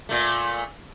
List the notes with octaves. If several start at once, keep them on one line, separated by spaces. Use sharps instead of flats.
A#2 A3